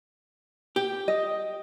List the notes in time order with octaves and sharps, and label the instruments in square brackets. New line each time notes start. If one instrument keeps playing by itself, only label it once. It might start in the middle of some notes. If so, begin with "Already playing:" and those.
[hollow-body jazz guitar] G4
[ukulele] D#5